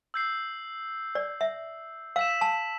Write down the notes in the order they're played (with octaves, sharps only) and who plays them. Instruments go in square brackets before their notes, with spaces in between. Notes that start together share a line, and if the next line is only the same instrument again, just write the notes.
[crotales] E6 G6 C7
[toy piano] D5
E5
[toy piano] F5 [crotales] E6 B6 E7
[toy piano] A5